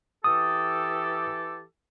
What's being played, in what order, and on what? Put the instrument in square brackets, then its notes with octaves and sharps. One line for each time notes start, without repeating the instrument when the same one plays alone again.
[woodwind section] E3 G4 A4 [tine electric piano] D#6